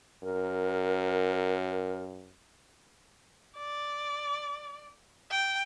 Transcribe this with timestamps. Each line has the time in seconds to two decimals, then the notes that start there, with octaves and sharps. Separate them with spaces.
0.23 F#2 A#4
3.57 D5
5.31 G5